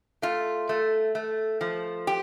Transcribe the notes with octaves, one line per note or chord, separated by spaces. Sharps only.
A3 F4
A3
A3
F3
G4